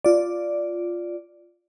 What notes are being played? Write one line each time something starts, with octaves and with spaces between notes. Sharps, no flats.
F4 D5